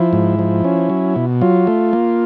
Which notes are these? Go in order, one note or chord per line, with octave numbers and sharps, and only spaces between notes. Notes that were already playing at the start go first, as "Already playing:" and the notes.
Already playing: F3 E4
G#2
F3
C#4
F#3
B2
F#3 F4
A3
A#3